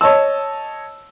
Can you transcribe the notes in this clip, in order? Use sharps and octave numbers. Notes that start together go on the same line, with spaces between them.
C#5 D#5 A5 E6